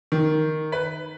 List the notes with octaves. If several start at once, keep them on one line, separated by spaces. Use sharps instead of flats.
D#3
B4